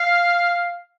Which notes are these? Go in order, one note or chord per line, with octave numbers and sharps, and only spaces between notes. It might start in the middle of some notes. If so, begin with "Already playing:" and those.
Already playing: F5